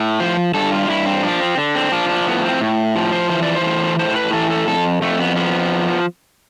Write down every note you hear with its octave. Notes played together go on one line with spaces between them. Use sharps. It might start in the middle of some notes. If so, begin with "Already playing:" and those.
Already playing: A2
F3 C5
G2 A4
F4
G2 E4
C4
F3 D4
C4
D3
C4
F3 D4
D4
A2 B3
C4
A2
F3
C5
E3 C5
D5
C5
A2
A2 C5
B4
E3 A4
A4
F2 A4
F2 A3
B3
F3 B3